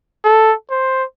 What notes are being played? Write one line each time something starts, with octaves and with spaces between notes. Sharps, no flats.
A4
C5